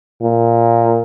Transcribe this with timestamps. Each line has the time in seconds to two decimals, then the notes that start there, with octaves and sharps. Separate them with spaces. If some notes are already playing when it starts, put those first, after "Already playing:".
0.22 A#2